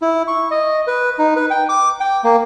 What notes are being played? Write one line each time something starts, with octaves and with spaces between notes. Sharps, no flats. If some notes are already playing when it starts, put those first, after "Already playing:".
E4
C#6
D#5
B4
D#4
B4
G5
D6
G5
A#3